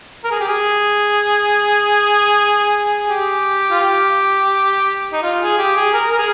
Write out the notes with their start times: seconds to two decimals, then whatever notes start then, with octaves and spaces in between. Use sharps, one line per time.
0.24 A#4
0.31 G#4
0.40 G4
0.48 G#4
3.08 G4
3.71 F4
3.80 G4
5.13 D#4
5.23 F4
5.41 G#4
5.58 G4
5.76 G#4
5.94 A#4
6.12 A#4
6.18 G#4